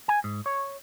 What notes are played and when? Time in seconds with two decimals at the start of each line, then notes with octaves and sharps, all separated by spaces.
0.08 G#5
0.24 G#2
0.46 C#5